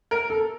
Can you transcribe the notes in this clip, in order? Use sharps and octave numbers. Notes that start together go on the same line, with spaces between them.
A#4
A4